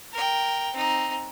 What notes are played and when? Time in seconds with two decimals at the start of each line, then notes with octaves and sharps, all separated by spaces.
0.13 A#4 G5
0.74 C4 D#4